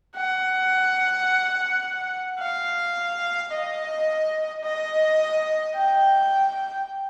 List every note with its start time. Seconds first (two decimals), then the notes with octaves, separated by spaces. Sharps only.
0.16 F#5
2.40 F5
3.52 D#5
4.64 D#5
5.76 G5